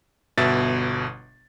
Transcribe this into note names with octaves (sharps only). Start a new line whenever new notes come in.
G1 B2 E5 A6